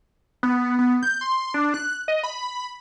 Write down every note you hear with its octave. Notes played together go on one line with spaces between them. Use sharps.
B3
B3
G6
C6
D4
F#6
D#5
B5